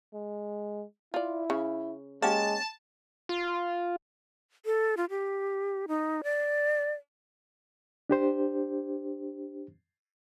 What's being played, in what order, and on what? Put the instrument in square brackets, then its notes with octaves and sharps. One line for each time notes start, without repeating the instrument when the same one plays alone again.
[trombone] G#3
[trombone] E4 [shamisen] F4 D5
[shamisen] C#3
[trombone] G#3 [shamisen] A#3 C#4 G4 [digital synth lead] A5
[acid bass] F4
[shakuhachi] A4
F4
G4
D#4
D5
[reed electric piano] D4 G4 C5